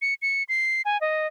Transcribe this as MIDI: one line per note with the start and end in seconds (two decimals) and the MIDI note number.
0.02 0.14 97
0.22 0.43 97
0.49 0.82 96
0.85 1.00 80
1.01 1.27 75